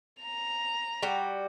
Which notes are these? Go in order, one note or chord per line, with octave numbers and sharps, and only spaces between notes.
A#5 F7
G3 F#4